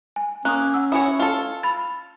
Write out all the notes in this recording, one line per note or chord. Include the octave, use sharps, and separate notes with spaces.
G#5
A#3 C#4 D#6 F#6
F#5 E6
E4 F#4 C#5 G#5 D#6
F4 A4
B5 A6